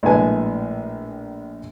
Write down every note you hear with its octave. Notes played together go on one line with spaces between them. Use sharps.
A#1 A2 G#3 B4 G#5 A5